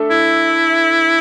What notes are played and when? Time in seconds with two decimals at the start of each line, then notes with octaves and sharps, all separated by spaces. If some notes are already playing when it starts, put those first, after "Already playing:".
Already playing: A3 D4 A4 E5
0.11 E4